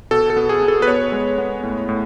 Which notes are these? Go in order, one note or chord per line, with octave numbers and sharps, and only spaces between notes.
B2 A4
A4
B3
G#4
B3
A4
B4
B3 C#5
G#3
B3
A2
A2